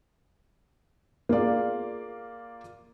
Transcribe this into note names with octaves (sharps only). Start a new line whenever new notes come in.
A#3 F4 G#4 D5 F5